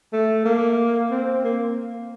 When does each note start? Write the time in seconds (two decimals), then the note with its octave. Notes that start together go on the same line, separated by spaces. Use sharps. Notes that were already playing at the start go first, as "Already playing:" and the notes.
0.13 A3
0.45 A#3
1.11 C4
1.44 A#3